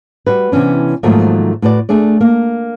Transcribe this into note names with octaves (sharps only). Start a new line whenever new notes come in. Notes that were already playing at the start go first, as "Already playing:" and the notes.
G3 F#4 B4
C3 E3 B3 C#4 D4
G#2 D#3 F3 F#3 A3 A#3
A2 F#4 B4 D5
A3 D4 G#4 D5
A#3